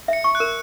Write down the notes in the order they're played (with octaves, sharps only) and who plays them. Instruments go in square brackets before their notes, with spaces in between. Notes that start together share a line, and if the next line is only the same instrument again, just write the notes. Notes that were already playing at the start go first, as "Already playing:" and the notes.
[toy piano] E5 [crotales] C#7
[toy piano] C#6
[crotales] F#6
[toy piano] A#4